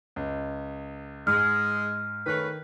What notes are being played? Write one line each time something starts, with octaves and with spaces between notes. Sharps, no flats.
C#2
G#2 G#3 F6
D#3 A3 C#4 B4